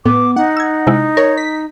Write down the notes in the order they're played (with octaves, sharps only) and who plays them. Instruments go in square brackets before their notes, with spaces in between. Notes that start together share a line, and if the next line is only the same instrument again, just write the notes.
[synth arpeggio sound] A2 [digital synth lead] B3 [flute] D6
[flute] D#4 [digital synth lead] F#5
[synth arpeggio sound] E6 G#6
C3 G#3 E4
[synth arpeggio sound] A#4 [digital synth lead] C#5
[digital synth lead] B6